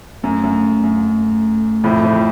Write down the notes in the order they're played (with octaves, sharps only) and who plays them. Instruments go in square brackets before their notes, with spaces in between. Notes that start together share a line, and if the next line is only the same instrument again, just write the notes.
[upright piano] F#2 [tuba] A3
[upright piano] F#2
F#2
F2 A2
F2 A2